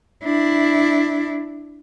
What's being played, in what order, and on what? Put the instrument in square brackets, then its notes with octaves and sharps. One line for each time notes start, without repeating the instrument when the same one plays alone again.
[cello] D4 E4